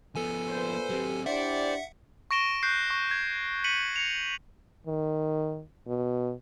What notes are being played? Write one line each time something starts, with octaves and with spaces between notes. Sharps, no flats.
F3 B3 A4 G#5
A#2 B4 C5
F#3 C4 G4
D4 E4 G4 C5 D5 E5 F#5 C#7
C#6 A#6 D7 E7 G7
C#6 F#6 G6 C7
C#6
G#6
B6 C#7 D#7 F#7
A#6 C#7 F7
D#3
B2